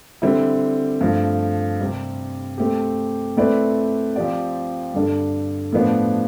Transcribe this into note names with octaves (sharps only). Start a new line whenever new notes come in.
D3 G3 C4 E4
G2 F3 A3
C3 G3 C4 G4
A3 C4 G4
A3 C4 E4 B4 D5
F3 C4 G4 D5
G2 D3 G3 D4 A4
A2 F3 B3 D4